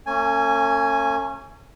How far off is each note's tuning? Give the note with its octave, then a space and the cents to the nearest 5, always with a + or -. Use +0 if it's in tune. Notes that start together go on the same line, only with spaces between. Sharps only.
A3 +45 C#4 -20 G#5 +0